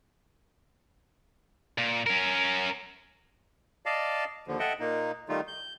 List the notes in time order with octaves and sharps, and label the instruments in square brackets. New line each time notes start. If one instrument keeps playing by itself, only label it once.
[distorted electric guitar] A#2
C#4 A#4
[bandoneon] D5 D#5 F5 A5
D#2 D3 F3
A4 D#5 E5 F#5 G5
A#2 A#3 D#4
D#3 G3 A3 D#4 F4
G6